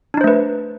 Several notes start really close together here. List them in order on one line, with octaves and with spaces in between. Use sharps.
D4 D#4 C5 A3 B4